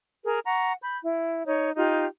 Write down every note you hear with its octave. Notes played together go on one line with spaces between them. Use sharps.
G#4 A#4
F#5 A#5 C#6
B5 G6
E4
D#4 C#5
D#4 F4 G4